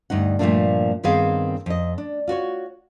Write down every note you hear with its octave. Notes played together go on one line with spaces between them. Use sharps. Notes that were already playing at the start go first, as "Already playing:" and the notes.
D2 G2 D#4 F#5
G2 A#2 F3 A3 A#3 D4
G2 D#3 B3 C4 G#4 F5
F2 D#5
D4
F4 F#4 C5 C#5